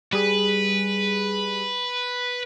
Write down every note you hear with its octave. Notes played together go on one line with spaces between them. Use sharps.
G3 G#4 B4